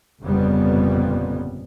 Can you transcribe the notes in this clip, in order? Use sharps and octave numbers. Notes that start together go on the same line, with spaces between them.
G1 F2 A#2 C#3 G3 B3